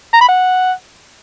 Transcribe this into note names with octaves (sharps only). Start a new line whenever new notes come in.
A#5
B5
F#5